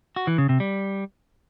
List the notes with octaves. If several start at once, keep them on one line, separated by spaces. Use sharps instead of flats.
F#4
E3
C#3
C3
G3